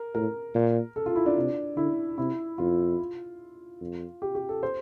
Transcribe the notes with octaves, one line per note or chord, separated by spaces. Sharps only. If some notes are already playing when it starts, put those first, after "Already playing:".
Already playing: A#4
A2 A#4
A#2
A4
F4
E4
D4
C3
D3 E4
C3 E4
F2 F4
F2
G4
G4
A4
C5